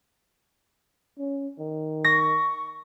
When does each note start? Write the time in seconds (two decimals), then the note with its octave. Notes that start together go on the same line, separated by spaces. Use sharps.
1.19 C#4
1.59 D#3
2.05 C#6 A#6